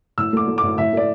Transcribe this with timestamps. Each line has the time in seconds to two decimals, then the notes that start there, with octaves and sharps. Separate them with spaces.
0.18 A2 E6
0.33 A3 D6
0.48 A3
0.58 D6
0.63 A2
0.78 A2 E5
0.93 A3 D5